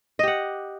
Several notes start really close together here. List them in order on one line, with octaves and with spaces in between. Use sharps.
D#5 G4 F#5